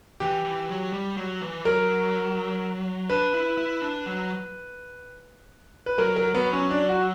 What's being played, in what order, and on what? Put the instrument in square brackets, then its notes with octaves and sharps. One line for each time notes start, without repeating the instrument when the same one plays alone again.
[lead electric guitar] E3 [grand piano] G4
[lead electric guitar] E3
F#3
G3
F#3
E3
[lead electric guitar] F#3 [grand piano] A#4
[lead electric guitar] D4 [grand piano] B4
[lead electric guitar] E4
E4
D4
F#3
[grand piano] B4
[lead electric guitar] F#3 [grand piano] A#4
[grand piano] A#4
[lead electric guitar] F#3 [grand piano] B3
[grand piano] C#4
D4
F#4